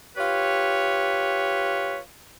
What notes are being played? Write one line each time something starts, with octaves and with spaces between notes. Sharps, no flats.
F4 G4 B4 C#5